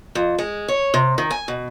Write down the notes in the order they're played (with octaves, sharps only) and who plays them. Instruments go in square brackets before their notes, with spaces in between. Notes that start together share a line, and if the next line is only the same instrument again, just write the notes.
[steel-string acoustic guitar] F2
G#3
C#5
C3
D#3
G#5
B2